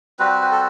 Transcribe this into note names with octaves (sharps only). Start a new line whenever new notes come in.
G3 C4 F#4 B4
B4
A4